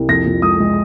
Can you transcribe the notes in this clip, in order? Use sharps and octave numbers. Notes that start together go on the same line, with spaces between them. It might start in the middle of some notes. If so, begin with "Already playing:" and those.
Already playing: C2
F2 A#6
F2
G#3 D#6
G#3